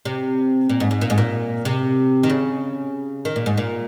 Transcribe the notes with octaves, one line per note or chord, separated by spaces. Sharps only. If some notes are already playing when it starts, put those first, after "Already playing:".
C3
A#2
G#2
G#2
A#2
G#2
A#2
C3
D#3
C#3
D#3
A#2
G#2
A#2